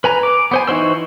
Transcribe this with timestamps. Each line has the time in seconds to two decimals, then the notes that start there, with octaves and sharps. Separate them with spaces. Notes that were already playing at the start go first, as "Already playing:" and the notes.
0.04 B4 G#5 A#5
0.23 D6
0.51 B3 C5 G#5
0.68 E3 D#4 F#4 C5 E6